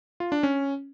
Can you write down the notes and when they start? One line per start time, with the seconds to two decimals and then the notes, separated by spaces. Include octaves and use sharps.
0.20 F4
0.32 D4
0.43 C#4